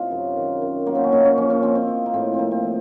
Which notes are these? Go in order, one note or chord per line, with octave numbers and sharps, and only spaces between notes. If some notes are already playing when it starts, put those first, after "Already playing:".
Already playing: C3 D#4 F4
F#2
D#3
F#2
F#3 A#3
C4
C#4
A#2 D#4
C#4
F3 C#4
C#4
F3 C4
C4
F3
A#3
A2 C4
C4
F3 A#3
C4
F3